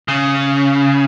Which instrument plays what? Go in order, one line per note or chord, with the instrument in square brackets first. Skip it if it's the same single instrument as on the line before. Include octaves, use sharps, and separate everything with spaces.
[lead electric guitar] C#3